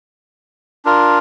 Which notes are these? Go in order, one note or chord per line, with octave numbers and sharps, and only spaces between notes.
D4 F4 A#4